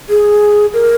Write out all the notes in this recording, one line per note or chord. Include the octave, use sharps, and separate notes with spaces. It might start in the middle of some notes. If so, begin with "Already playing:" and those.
G#4
A#4